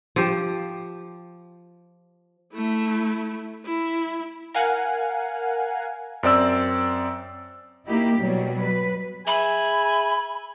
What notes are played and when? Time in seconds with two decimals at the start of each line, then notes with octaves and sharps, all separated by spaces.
0.16 F3 G4
2.53 A3 E4
3.66 E4
4.54 A#4 F5 F#5 G#5
6.23 F#2 C4 D5 E6
7.87 A#3 D#4 E4 G4
8.19 B2 F#3 G3
8.59 B4
9.27 G#4 E5 G#5 B5